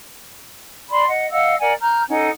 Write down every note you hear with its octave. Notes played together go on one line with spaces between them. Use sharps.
D5 B5 C6
D#5 F#5
D#5 F5 F#5 E6
A#4 D5 F#5 G#5
A#5 F6 G6
C#4 D#4 A4 F#5